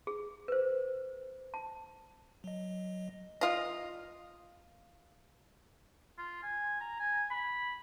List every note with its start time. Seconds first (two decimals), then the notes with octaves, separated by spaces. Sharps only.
0.07 G#4
0.48 B4 C5
1.54 A5
2.44 F#3 D#5
3.41 F4 D#5
6.18 F4
6.43 G#5
6.81 A#5
6.99 G#5
7.31 B5